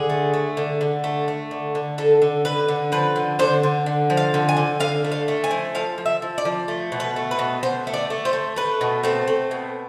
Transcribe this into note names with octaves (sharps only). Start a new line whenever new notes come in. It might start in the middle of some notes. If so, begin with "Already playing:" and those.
Already playing: D3 G#4
A3
A3
D3
D3
A3
A3
D3
D3
D3 A4
D3
D3 B4
D3
F3 B4
D3
D3 C5
D3
D3
F3
F5
D3
G#5
D3
D3 F5
A3
F5
A3
G#5
F3
F3 F5
F3
E5
F3
D5
F3
A3
B2
B4
A3
B4
B2
B2 C5
A3
D5
A3
C5
A3
A3 B4
B2
A3 C4
A3
B2